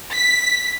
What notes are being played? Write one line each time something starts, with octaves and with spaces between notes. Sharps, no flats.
B6